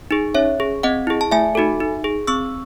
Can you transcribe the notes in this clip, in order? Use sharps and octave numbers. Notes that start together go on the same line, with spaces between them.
D#4 G#4
C#4 C#5 E5
G#4
C4 D#5 F#5
E4 G#4
A5
A3 E5 G#5
D#4 F#4 A4
D#4
G#4
C4 C#6 E6